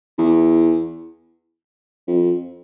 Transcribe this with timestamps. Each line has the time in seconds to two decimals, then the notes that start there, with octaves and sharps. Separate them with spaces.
0.18 E2
2.08 F2